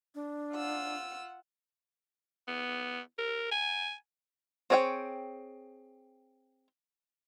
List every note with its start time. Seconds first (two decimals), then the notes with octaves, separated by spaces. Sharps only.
0.15 D4
0.54 F4 F#5 E6
2.48 B3
3.19 A#4
3.51 G#5
4.70 C4 G#4 C#5 F5 G5